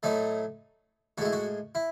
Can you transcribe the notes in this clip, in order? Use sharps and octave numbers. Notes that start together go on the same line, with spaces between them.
A2 F#3 A3 D#4
A2 G#3 E4 F#4
F#4
E4